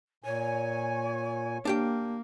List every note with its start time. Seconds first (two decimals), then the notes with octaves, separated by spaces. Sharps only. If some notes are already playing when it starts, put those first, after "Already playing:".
0.24 A#2 C#5 G#5
1.65 A#3 D4 G4 G5